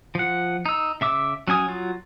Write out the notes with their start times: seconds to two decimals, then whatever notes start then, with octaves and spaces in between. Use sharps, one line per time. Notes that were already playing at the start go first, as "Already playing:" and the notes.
0.15 F3 F#5
0.66 D#4 E6
1.01 C#3 E5 D6 E6
1.48 F#3 C#4 G#5 D#6
1.68 F#3 F4